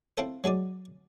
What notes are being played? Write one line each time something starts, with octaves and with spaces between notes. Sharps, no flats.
C4 E4 F4 A4 C5
F#3 G#3 D#4 D5